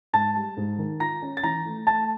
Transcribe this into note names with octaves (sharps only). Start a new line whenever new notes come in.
G#2 A5 A6
G3
G#2
D#3
F4 A#5 A#6
C#4
A6
E3 A#5 A#6
A3
A3 A5 A6